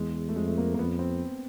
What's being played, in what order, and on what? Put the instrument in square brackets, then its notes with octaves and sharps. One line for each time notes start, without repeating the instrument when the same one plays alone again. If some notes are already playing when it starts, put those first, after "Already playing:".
Already playing: [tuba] E2 [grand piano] G#3
[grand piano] A3
[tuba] F2 [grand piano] G#3
[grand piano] A3
A#3
A#3
[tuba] F2 [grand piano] B3
[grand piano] C4